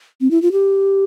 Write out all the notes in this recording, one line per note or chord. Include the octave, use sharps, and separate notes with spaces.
C4
E4
F4
G4